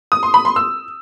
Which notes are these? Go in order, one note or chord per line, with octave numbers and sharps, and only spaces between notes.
D#6
C6
B5
C6
E6